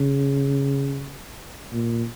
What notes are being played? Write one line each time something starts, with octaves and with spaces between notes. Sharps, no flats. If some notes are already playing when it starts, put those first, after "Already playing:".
Already playing: C#3
A#2